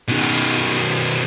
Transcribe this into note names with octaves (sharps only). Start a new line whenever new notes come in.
B2 D#3